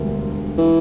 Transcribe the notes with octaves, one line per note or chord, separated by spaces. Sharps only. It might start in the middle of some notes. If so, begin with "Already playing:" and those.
Already playing: E1 D2 D3 G3 A#3
E3